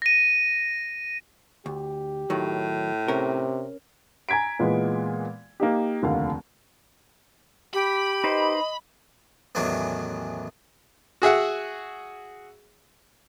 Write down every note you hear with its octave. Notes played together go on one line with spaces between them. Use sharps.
A#6 D#7
D2 G4
A2 D#3 F#3
C3 C#4 A#4
G#5 A#5 G#6 B6 D7
A#2 E3 G#3 B3
A#3 D#4 G4
F1 D#2 D3 F5
G4 B5
D#4 B4 C5 D#5
A1 E2 D#3 F#3 D4
F#4 G#4 E5 F#5